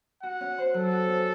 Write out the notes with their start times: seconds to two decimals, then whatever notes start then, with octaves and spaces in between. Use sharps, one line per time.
0.23 F#4 F#5
0.41 C#4
0.58 C5
0.74 F#3 A4
0.91 F#4
1.08 C#4